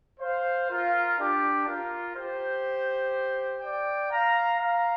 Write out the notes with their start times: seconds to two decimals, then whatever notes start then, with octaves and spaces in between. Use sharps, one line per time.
0.20 C5 F5
0.69 F4 A#4
1.18 D4 G4
1.67 F4 A#4
2.16 G4 C5
3.62 D5 G5
4.10 F5 A#5
4.59 F5 A#5